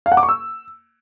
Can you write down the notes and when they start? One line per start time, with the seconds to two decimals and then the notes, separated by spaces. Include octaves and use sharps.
0.06 F5
0.12 F#5
0.17 D6
0.23 C#6
0.29 E6